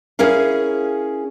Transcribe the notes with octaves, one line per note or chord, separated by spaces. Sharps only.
C#4 E4 G#4 A#4 F5